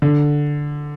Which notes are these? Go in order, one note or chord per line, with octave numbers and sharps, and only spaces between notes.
D3